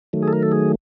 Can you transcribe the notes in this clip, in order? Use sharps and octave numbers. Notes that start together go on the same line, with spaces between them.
D#3 F#3 A3
G#4
A4
A#4
A4
G#4